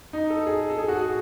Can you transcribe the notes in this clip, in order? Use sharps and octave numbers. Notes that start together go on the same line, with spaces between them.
D#4
A4
G#4
A4
G#4
F#4
G#4